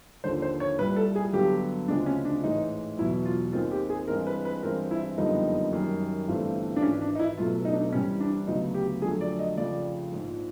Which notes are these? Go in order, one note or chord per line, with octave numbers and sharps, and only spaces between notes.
D#2 D3 F3 C5
C5
C#5
C2 A#2 G3 B4
A4
G#4
G2 D3 F#3 B3 G4
D2 C#3 F3 G#3 C4 D4
C#4
D4
A1 G#2 E3 G#3 D#4
E2 B2 F#3 E4
F4
D#2 D#3 G#3 C4 F4
G4
G#4
G2 E3 G#3 C4 A#4
B4
B4
G2 E3 G#3 C4 A#4
E4
F#1 F2 D3 G3 B3 D#4
F#2 D#3 G3
G1 G2 E3 A3 C4
D4
G#1 G#2 E3 C#4
D4
D#4
E4
C#2 B2 F#3 A3 F4
D#4
D4
D#4
C2 C3 E3 G3 C#4
D4
D2 C#3 F#3 B3 D#4
G4
F2 D3 F#3 A3 G#4
D5
D#5
F1 F2 C#3 D5
A#1 G#2 F3